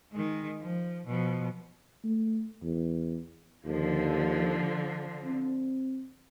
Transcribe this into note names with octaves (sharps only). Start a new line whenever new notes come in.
D#3 G#3
F3
B2 F3
A3
E2
D#2 D3 F3
C4